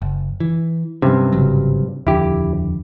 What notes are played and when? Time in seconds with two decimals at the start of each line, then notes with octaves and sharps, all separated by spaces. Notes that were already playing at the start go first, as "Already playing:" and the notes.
0.02 F#1
0.40 E3
1.02 G2 C3 F#3 C#4
1.33 G#1 C#3 F#3
2.07 D#1 F2 D3 E4 G4